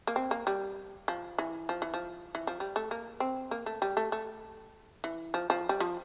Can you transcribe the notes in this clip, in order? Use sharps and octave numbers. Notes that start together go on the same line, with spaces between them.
A#3
C4
A#3
G3
F3
E3
F3
E3
F3
E3
F3
G3
A3
A#3
C4
A#3
A3
G3
A3
A3
E3
F3
F3
G3
F3